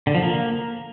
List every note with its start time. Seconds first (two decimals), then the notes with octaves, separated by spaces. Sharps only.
0.07 D3
0.15 F3
0.22 A#3